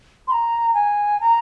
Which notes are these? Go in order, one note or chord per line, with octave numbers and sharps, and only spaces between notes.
C6
A#5
G#5
A#5